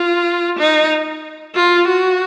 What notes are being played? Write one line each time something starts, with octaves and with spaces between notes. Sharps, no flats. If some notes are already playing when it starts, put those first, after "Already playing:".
Already playing: F4
D#4
F4
F#4